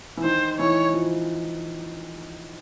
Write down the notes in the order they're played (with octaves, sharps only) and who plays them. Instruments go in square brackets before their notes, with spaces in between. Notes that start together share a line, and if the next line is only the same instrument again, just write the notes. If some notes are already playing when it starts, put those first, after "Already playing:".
[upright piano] E3
[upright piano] D#3 [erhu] C5
[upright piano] E3 [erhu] C#5
[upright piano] F3